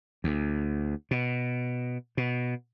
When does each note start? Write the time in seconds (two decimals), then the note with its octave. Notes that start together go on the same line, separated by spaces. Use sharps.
0.24 D2
1.11 B2
2.17 B2